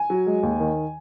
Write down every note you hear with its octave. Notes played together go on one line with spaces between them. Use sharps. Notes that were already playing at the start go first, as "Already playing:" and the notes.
Already playing: G#5
F#3
G#3
D#2
D#3